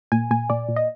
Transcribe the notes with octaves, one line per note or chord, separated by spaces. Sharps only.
A#2 G#5
A#2 G#5
A#2 D5
A#2
D#5